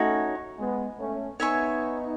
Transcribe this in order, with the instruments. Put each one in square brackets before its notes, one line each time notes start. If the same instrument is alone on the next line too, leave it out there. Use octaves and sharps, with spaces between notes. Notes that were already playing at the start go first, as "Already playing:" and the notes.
Already playing: [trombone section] A3 C#4 [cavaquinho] D#4 F#4 C#5
[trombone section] G#3 B3
A3 C#4
[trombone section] B3 D#4 [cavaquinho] C#5 E5 G#5 C#6